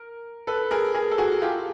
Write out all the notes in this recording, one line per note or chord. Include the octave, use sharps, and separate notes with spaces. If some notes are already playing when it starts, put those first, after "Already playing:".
Already playing: A#4
A4 B4
G#4 A#4
G#4 A#4
A4
F#4 G#4
F4 G4